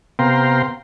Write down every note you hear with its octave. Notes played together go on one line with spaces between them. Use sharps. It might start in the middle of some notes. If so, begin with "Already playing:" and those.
C3 B3 F5 G5 A#5 C6